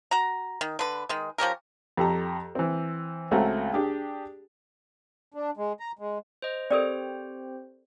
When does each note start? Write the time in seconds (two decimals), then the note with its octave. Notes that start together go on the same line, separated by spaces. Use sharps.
0.11 F#4 A#5
0.61 D#3
0.79 D3 B4
1.09 D#3 G#3
1.38 F3 C#4 G4 A#4
1.97 F2 G4 A4 A#5
2.55 E3 C4
3.31 C#2 A3 C4 F#4 A#5
3.73 D4 G4 G#4
5.34 D4
5.57 G#3
5.80 A#5
5.99 G#3
6.42 C5 D#5
6.71 C4 G4 A4 A#4 C5 D5